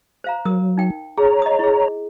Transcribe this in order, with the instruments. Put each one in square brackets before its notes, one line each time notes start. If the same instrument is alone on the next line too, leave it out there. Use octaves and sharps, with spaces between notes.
[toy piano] C5 F5 A#5
[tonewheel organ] F#3 [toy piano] A#4 D#6
[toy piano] D#4 G5
[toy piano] G#4 [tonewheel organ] C#5 A#5
[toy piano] D#5 D#6
E4 G#4